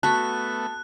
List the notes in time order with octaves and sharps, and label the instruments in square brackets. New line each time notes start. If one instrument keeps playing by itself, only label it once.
[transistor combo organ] A3 B3 [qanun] F#4 B5 C#6 [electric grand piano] A5 [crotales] F#6